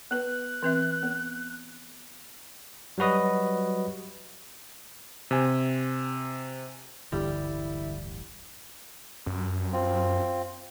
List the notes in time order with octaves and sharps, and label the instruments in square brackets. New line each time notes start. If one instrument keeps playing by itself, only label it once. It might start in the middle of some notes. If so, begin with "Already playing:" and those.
[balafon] B3 B4 [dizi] F#6
[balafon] E3 C4 E5
B3
[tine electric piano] F#3 G3 F#4 B4 D#5
[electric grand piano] C3 G#5
[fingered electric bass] D1 A1 G2 [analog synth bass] D3 [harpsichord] G3 [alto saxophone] E4
[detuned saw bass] F#2
[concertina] C4 F4